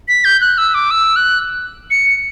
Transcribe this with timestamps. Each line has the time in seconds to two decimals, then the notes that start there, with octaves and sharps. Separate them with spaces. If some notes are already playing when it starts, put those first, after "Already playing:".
0.08 B6
0.25 G6
0.41 F#6
0.58 E6
0.74 D6
0.91 E6
1.16 F#6
1.91 C#7